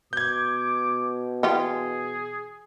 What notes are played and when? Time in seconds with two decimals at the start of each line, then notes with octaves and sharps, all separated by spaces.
0.13 B2 D6 G6 G#6
1.43 E3 F4 G4 G#4